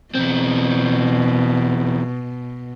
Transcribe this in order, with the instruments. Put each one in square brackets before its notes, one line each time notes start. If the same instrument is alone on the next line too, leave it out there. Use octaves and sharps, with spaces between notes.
[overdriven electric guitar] E2 C4 [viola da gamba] B2